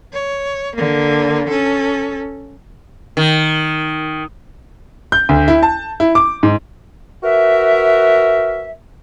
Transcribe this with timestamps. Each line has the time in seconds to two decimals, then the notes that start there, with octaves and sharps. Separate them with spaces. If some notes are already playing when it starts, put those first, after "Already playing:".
0.13 C#5
0.76 D3 A#3
1.49 C#4 A4
3.17 D#3
5.12 G6
5.29 D2
5.48 E4
5.63 A5
6.00 E4
6.15 D6
6.43 G#2
7.23 F#4 A#4 B4 E5